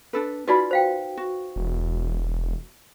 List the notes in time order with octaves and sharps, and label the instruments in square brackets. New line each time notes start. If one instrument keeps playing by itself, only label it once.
[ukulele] D4 A4 B4
[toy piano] D#4 F#4 B4 [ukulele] F4 D5 B5
[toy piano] C5 F5 G5
[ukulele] F#4
[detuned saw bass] E1